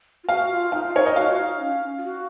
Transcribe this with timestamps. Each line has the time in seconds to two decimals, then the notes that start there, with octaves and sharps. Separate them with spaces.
0.24 F4
0.29 F#4 F5
0.51 F4
0.72 D#4 F5
0.86 F4
0.94 D#4 C#5
1.06 D#5
1.16 F#4 F5
1.32 F4
1.38 D#4
1.60 C#4
1.99 F4
2.04 F#4